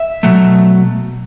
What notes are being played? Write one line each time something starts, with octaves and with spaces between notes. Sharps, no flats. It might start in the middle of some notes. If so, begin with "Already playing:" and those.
Already playing: E5
B2 F#3 A3